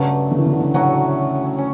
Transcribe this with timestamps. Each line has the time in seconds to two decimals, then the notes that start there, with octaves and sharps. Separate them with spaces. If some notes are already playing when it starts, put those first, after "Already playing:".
Already playing: G2 C#3 F#3 A3
0.31 D3
0.38 E3
0.46 D3
0.53 E3
0.60 D3
0.74 A2 C#3 F#3 C#4 F#4
1.59 C#4